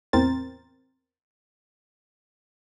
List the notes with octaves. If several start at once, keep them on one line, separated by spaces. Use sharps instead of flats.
E2 A2 C4 A#4 C5 A6